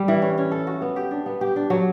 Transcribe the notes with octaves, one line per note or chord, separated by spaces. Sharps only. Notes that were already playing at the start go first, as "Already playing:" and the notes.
Already playing: G3 G4
E3
C#4
C#4
A4
F#4
B3
G4
D4
B3
G4
D4
F#3